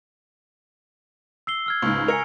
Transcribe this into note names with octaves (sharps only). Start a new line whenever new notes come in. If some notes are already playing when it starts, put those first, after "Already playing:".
E6 C7 G7
E6 F6 G#6
C#2 G#2 C#6 F6
A#4 G#5 C#7 F7